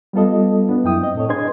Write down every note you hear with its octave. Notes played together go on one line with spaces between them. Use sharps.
G3 B3 F4 A4 D#5
B3 D4
F#2 E4 G5 D#6
C4 D#5
A2 A4 C#5
D4 G#4 B4 D#5 C6 G#6